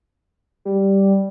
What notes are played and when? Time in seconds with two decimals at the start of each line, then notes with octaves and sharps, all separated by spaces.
0.65 G3